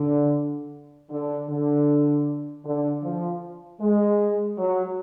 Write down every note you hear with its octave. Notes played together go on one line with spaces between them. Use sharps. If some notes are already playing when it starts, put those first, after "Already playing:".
Already playing: D3
D3
D3
D3
F3
G#3
F#3